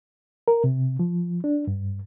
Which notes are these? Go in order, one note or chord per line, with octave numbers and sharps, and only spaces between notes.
A#4
C3
F3
D4
G2